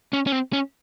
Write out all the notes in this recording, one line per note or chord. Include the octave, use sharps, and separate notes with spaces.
C#4
C#4
C4
C#4